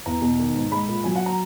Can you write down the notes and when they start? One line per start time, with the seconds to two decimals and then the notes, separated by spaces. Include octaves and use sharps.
0.06 E2 A#5
0.22 B2
0.39 D#3
0.55 G#2
0.71 G#3 B5
0.88 A#2
1.04 F#3 G#5
1.16 F#5
1.26 A#5